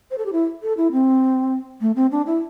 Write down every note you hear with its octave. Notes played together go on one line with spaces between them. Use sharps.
C5
A4
G4
E4
A4
E4
C4
A3
C4
D4
E4